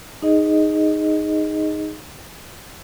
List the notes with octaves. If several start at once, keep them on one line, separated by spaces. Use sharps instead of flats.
D#4 G#4 D#5